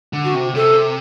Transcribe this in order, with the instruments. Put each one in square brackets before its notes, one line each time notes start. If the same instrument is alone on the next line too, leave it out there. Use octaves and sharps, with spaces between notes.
[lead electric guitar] D3
[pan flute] F#4
[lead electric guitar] C3
[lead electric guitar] C3 [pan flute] A4